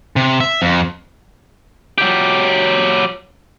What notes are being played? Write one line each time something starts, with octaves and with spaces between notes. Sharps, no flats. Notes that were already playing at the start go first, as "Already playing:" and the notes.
C3
E5
F2
F#3 G4